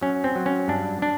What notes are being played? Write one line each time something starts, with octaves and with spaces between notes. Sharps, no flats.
F#3 C#4
C4
F#3
C#4
G2 D4
D4